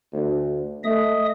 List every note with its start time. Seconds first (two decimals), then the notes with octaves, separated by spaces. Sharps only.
0.13 D2
0.84 A3 D#5 E5 D#6